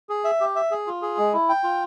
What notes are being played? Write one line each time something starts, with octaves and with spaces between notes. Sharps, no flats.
G#4
E5
G4
E5
G#4
F4
G#4
G#3
E4
G5
F4